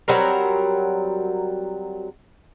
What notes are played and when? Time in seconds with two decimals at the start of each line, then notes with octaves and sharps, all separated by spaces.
0.08 F#3 G3 C4 A#4